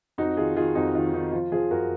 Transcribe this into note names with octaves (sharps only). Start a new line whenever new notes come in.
F2 D#4 F#4
D#3 F4 G#4
D#3 F4 G#4
F2 D#4 F#4
D#3 F4
D#3 D#4
F3 F4
F3 F4 G#4
F#2 F#4 A#4